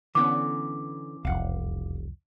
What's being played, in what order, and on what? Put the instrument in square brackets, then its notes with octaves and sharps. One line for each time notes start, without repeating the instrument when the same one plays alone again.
[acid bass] D3 [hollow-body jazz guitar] E3 B3 C#4 [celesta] D6
[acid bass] E1 [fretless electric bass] C2 F2 [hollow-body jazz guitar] F5 F#5